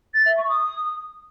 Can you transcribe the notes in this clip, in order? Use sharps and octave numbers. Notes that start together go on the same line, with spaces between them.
A6
E5
C#6
D#6